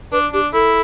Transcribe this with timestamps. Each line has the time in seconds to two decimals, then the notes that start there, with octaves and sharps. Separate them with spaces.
0.12 D4 B4
0.33 D4 G4
0.53 E4 A4